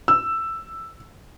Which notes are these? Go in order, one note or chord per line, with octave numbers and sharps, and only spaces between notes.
E6